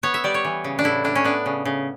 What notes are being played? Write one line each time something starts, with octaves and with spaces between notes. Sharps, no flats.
B3 C#5
E5
G3 D5
C#5
E3
C#3
D4
A2 E4
A2 D4
C#4
B3 D4
C#3
C#3